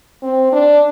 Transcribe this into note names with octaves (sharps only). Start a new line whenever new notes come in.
C4
D4